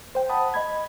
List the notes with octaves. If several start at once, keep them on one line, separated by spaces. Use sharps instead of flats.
C5 G5
F#5 A5 B5 D#6
D#5 B5 G#6